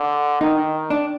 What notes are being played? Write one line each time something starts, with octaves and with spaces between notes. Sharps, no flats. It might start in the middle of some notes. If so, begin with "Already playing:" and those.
Already playing: D3
D#3 D#4
D4